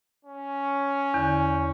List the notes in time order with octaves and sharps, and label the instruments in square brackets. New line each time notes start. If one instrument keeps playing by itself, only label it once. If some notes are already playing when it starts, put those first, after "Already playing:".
[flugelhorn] C#4
[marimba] E2 D3